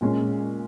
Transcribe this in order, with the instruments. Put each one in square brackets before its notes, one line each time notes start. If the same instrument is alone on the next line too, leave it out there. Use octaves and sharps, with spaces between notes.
[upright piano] A#2 G#3 C#4